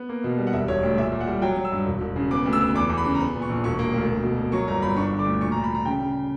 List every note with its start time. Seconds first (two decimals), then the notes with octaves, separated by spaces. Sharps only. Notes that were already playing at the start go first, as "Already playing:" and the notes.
Already playing: B3
0.09 A#3
0.24 B2
0.38 G3
0.47 F#5
0.53 E1 E5
0.68 E1 C#5
0.83 D2
0.98 A#2 E5
1.12 A#2
1.20 F#5
1.28 G3
1.42 F#3 G5
1.57 F#3
1.64 E6
1.72 G2
1.86 E1
2.01 E1
2.16 C#3
2.31 B3 D6
2.46 D2
2.53 E6
2.61 B3
2.75 E2 D6
2.89 E2
2.97 B5
3.05 C#3
3.15 A#5
3.20 B3 B5
3.34 A#2
3.42 C#6
3.49 A#1
3.64 E1 C#6
3.79 A#3
3.94 D2
4.09 A#3
4.23 B2
4.37 A#3
4.52 F#3 C#6
4.67 G1 A#5
4.82 G1 B5
4.96 D4 C#6
5.12 D3
5.19 D6
5.26 D2
5.41 A#2 C#6
5.52 A#5
5.57 A#2
5.64 B5
5.71 A#2 A#5
5.85 C#3 G5
6.01 C#3